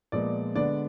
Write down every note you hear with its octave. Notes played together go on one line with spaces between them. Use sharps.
A#2 F3 G#3 B3 D5
D3 G#3 B3 D4 D5